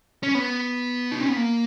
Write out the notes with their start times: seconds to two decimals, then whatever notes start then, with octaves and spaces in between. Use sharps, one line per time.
0.23 C#4
0.35 B3
1.11 D#4
1.20 C#4
1.29 B3
1.37 A#3